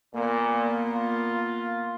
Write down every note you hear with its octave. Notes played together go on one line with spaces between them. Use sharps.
A#2 A#3 B3
F4